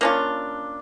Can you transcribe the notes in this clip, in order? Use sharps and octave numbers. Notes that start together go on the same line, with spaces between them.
A#3 C#4 D4 F4